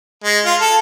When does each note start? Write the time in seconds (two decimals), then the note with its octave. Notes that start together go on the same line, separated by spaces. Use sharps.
0.24 G#3
0.45 F4
0.61 A4